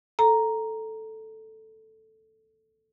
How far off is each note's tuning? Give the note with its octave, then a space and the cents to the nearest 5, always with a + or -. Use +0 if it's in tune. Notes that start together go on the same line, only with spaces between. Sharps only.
A4 +0 A#5 +0